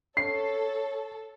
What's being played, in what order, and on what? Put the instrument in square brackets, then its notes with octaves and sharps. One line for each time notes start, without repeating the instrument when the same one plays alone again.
[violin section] A4 [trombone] C#5 [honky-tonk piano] C7